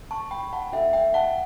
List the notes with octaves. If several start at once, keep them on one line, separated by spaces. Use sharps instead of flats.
A5 C#6
G5 B5
F#5 A5
A3 D4 F#4 A4 E5 G5
E5 G5
F#5 A5